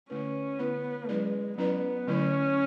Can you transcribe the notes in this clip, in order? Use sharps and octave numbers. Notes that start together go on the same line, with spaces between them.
D3 A3 C#4 E4 B4
D3 A3 B3 E4 B4
F#3 G#3 C#4 E4 B4 D5
F#3 B3 C#4 E4 B4 D5
D3 F#3 A3 C#4 E4